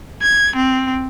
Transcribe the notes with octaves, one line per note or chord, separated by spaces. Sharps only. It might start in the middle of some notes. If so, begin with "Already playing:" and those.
G#6
C4